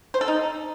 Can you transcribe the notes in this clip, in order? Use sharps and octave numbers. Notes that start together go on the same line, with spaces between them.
C5
A4
D#4